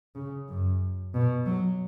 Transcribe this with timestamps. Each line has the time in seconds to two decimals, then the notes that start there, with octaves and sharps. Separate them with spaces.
0.15 C#3
0.49 F#2
1.14 B2
1.46 F#3